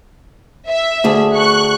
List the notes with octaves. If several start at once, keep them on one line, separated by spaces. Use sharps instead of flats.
E5
D2 G#4 A5
C#6 F#6